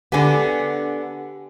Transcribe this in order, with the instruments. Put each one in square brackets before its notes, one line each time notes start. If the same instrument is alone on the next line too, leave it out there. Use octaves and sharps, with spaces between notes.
[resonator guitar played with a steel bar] D3 B3 [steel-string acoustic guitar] G4 G#5